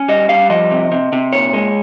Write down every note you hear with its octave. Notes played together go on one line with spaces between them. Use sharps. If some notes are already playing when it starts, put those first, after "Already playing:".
Already playing: C#4
G3 D#5
G3 F5
F3 D#5
C3
C3
C3
A#2 C#5
G#3